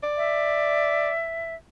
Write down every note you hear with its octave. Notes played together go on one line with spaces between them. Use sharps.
D5
E5